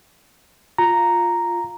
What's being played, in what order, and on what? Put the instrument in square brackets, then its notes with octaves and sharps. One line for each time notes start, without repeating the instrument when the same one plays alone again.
[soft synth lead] F4 [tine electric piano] A#5